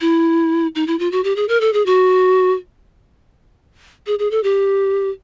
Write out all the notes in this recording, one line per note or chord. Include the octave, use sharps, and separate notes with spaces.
E4
D#4
E4
F4
F#4
G4
G#4
A#4
A4
G#4
F#4
G#4
G#4
A4
G4